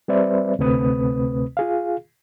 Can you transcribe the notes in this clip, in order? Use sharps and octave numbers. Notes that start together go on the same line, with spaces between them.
G3 C4 B4 C5 D5 E5
D2 C3 A3 C4 B4 D#6
F4 G#4 F5